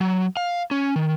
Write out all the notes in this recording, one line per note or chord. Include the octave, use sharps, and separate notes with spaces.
F#3
F5
C#4
D#3